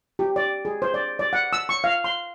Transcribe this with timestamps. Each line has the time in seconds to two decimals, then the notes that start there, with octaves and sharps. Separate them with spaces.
0.19 G4
0.36 D5
0.65 G#4
0.82 C5
0.94 D5
1.19 D5
1.33 F#5
1.53 E6
1.69 C#6
1.84 F5
2.04 C6